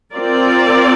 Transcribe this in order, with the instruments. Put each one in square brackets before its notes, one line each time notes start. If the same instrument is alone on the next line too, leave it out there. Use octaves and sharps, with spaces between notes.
[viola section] C4 F4 A#4 D5